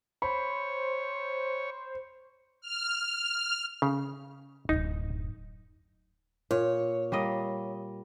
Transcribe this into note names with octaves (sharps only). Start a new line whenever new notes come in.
C5 C#5 B5
F6
C#3
D1 F#2 D#4
A#2 C#5
G3 A#3 D#5